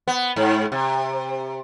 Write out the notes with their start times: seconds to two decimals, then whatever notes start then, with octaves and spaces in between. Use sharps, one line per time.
0.08 B3
0.36 G#2
0.72 C3